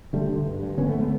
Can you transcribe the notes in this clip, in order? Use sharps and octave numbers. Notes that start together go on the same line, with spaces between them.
D3 G3 A3
D3
G2
G2
D3 B3 C#4
A3 B3
D3
A3 B3